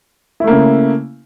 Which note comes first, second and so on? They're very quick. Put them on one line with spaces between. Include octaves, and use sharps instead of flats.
E4 A3 A#3 C#3